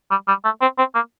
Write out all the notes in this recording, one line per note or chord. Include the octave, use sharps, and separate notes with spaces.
G3
G3
A3
C4
C4
A#3